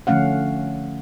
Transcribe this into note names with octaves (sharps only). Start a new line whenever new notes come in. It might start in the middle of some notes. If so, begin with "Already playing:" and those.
D3 F3 A3 C#4 F5 F#5